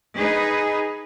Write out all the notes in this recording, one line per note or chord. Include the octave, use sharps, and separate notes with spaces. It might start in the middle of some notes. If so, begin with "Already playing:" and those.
D#4 G#4 B4